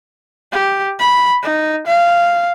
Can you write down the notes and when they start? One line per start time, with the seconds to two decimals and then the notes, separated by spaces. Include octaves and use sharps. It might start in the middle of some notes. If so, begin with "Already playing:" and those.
0.52 G4
0.99 B5
1.43 D#4
1.87 F5